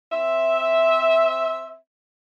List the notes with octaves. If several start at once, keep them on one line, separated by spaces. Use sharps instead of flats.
C4 C5 E5